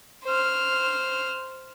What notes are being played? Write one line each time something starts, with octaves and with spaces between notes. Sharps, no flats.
C5 F6